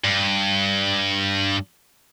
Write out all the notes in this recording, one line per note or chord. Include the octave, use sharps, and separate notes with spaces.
G2